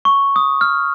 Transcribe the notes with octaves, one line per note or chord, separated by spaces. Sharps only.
C#6
D#6
F6